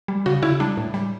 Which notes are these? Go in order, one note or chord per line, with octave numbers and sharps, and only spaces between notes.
G3
C#3 F#4
C#3 E4
G3 D4
A2
G3